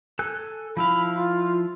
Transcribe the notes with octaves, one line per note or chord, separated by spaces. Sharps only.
A4 G#5 F#6
F3 E4 F5 B5
F4